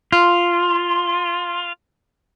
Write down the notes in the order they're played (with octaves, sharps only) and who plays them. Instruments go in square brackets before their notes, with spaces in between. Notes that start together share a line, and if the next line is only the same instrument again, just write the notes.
[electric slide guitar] F4 [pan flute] C6